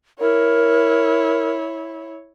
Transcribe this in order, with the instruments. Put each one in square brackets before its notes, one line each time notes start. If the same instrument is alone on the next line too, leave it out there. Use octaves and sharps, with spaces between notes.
[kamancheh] E4 C#5 [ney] A#4